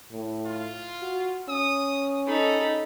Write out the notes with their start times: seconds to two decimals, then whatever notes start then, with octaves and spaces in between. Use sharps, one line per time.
0.11 A2
0.47 F4
1.02 F#4
1.49 C#4 D#6
2.28 D#4 A4 B5